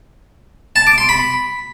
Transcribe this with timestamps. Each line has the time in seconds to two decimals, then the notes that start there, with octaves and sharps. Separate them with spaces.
0.76 A5
0.87 D6
0.98 C6
1.09 B5